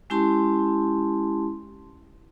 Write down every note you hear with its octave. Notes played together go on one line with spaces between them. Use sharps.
G#3 C#4 E4 G4 A5 C6